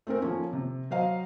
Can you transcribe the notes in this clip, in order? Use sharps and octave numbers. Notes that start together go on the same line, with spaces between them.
A3 C4 C#4 A#4
F3 A#3 C#4
C3
F#3 C5 D#5 F5 A#5